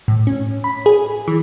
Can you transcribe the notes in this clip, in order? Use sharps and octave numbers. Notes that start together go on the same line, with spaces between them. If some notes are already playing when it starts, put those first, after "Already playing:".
A2
C#4
B5
G#4
E3